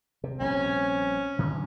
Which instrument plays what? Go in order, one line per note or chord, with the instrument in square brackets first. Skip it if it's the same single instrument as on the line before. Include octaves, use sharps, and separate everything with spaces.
[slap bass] C3
[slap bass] A#1 G3 C4 [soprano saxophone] C#4
[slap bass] F#2 D3